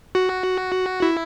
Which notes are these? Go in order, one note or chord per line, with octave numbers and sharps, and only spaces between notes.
F#4
E4